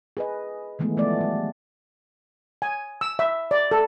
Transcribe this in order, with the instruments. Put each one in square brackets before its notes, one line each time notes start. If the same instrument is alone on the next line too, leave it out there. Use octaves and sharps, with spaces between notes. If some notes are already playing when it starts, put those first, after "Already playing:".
[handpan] G#4 B4 D#5
D#3 E3 G#3 A3 B3
F3 A3 B3 D5
G3
[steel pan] G#5
E6
E5
D5
A4